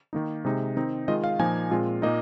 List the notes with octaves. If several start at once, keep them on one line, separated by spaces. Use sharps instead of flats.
D#3 A#3 D#4
C3 G#3 D#4
D#3 C4 D#4
D#3 G#3 F4 D#5
F5
A#2 F3 A#3 D#4 G#5
A#2 G#3 C4 F4
A#2 A#3 D#4 D#5